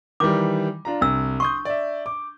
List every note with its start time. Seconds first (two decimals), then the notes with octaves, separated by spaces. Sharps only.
0.20 D#3 E3 G3 D6
0.85 D4 F4 A#5
1.01 C2 D4 E6
1.40 C6 C#6 D#6 G6
1.65 D5 E5
2.06 D6